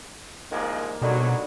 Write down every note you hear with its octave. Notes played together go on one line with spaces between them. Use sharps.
C2 D#3 F3 G#3 A#3
G#2 B2 D3 F#3 G3 D#4